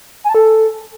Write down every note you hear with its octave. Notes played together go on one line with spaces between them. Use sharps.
G#5
A5
A4